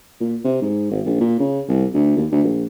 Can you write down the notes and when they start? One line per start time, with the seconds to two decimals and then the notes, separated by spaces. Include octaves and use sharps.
0.21 A#2
0.44 C3
0.61 G#2
0.91 G#1
1.06 A#1
1.20 A#2
1.40 C#3
1.68 C2
1.94 D2
2.16 D#2
2.32 D2
2.44 A#1